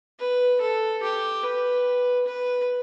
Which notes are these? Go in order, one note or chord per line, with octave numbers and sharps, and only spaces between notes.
B4
A4
G4
B4
B4